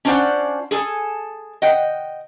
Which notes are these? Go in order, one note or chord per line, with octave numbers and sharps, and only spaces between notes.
C#4 D4 F4 C5 D5 F#5
G#4 A4 G#5
D#5 F#5 G5